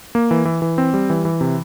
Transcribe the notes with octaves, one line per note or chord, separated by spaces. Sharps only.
A#3
E3
E3
E3
C4
G3
E3
E3
C3